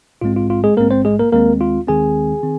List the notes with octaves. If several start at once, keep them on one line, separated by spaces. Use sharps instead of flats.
A#1 G#2 G#3 C4 F4
F4
F4
G#3 G#4
A#1 G#2 G#3 A#3 C4 A#4
C4 C5
G#3 G#4
A#3 A#4
D#2 D#3 G#3 A#3 C4 A#4
F4
D#2 D#3 G#3 C4 G#4 G#5
D#3 C4